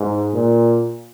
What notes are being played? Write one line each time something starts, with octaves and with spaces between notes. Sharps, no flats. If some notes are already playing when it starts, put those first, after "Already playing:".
Already playing: G#2
A#2